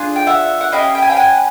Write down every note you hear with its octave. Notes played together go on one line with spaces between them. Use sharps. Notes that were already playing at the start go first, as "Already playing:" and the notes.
Already playing: D4 F4 G#4
G5
E5 F#5
F#5
C#4 E4 G4 D#5 F5
G5
G#5
F5 G5
F#5 G#5